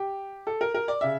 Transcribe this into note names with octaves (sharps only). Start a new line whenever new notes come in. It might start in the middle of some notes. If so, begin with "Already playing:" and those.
Already playing: G4
A4
A#4
A#4
D5
C#3 E5